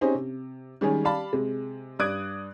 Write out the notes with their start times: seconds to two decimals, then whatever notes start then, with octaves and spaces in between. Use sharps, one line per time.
0.01 C4 C#4 D#4 G4 G#4 C5
0.15 C3
0.81 D#3 G3 G#3 C#4 G#4 C#5
1.04 G4 D5 F5 A5 B5
1.33 C3 G#3
1.99 G2 D5 D#6 F#6 G#6 D7